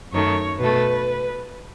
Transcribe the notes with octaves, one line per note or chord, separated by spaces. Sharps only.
F#2 D#3 A3 C#5
B2 A3 B4